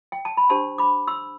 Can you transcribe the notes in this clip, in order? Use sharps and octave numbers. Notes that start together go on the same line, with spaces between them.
G5
A5
B5
D4 G4 C5 A5 C6
B5 D6
C6 E6